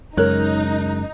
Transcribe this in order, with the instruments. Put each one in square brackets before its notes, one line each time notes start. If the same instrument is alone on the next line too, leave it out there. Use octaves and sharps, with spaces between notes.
[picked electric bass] F#2 [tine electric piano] C#3 G#3 F#6 [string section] D#4 [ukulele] A#4 C#5